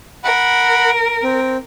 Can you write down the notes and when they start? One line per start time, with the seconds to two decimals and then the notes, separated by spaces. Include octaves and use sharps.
0.24 A#4 F#5 B5
1.24 C4